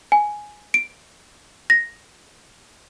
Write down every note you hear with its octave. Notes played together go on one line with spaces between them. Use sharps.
G#5
D7
A#6